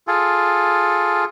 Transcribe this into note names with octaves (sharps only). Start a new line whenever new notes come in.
F4 G#4 A4